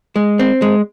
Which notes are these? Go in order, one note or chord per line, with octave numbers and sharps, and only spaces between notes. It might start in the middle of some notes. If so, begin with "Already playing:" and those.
G#3
C4
G#3